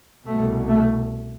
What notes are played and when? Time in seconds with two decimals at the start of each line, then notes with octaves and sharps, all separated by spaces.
0.27 C2 B2 A3
0.69 A3